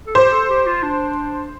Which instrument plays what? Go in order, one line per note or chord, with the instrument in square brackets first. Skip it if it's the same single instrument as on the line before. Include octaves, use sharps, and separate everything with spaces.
[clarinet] A4
[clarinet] G4 [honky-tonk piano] C5
[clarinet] A4
G4
F4
D4